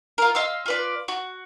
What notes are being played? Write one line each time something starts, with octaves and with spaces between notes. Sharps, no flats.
F4 A#4
D#5 F5 C6 E6
F4 B4 D5
F#4